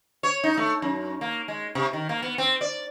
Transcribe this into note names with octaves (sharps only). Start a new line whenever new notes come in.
C#5
D#4
A3
F#2
A#3
G#3
C3
D#3
A#3
B3
C4
D5